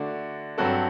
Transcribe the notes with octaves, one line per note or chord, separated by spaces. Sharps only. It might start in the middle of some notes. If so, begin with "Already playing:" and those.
Already playing: D3 A3 D4 F#4
G2 F#3 C4 F#4 A4